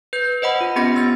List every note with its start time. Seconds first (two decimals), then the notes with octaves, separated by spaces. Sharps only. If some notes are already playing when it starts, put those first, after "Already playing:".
0.13 B4 G6
0.42 C5 D#5 F#5 B5
0.61 F4
0.76 B3 C#4 G4 B5 A#6
0.95 B3 E6 A6